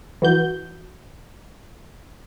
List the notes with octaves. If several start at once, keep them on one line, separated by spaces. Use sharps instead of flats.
E3 F#4 G6